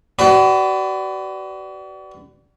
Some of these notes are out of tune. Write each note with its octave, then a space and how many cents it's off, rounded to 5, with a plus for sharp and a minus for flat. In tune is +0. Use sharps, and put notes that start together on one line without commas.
F#4 +40 B4 +25 D5 +0